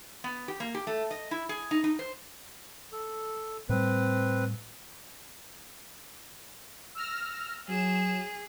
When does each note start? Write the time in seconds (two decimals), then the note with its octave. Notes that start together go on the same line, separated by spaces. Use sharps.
0.24 B3
0.48 G4
0.60 A#3
0.75 G4
0.87 A3
1.11 D#5
1.31 E4
1.49 G#4
1.71 D#4
1.84 D#4
1.99 C5
2.92 A4
3.69 A2 G3 C4 B4
6.95 E6 F6 A#6
7.68 F#3 G#4 E7